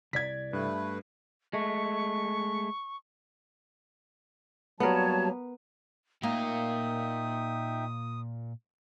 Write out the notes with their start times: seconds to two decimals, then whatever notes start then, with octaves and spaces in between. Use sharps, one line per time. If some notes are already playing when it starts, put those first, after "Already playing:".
0.13 C2 D5 G#6 B6
0.53 G2 A3 B4
1.53 G#3 A3 C#6
4.80 F#3 G3 A#3 B3 A#4 C#5 A5
6.23 A#2 A#3 D#4 E5 F5 G5 D#6